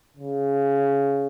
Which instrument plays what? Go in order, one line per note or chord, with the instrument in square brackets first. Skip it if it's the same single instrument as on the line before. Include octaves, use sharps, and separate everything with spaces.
[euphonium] C#3